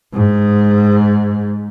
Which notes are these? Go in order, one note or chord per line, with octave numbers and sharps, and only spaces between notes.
G#2